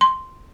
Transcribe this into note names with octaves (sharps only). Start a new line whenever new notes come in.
C6